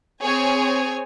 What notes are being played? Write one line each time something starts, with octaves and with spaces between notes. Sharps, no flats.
C4 G#4 C#5 G#5